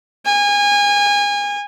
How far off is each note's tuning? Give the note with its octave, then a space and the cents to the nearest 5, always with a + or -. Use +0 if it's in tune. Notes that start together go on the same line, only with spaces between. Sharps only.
G#5 -30